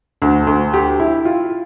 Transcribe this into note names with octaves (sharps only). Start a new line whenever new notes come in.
D2
D2
G4
E4
F4